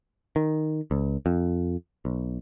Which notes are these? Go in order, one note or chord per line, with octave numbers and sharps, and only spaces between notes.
D#3
C#2
F2
B1